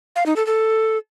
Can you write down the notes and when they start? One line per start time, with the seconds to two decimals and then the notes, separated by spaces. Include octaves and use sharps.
0.16 F5
0.26 D#4
0.36 A4
0.47 A4